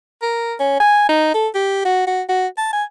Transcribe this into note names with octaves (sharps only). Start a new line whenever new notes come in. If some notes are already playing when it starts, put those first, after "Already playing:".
A#4
C#4
G#5
D#4
A4
G4
F#4
F#4
F#4
A5
G#5